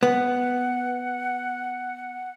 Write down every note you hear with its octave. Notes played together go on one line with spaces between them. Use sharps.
B3 F#5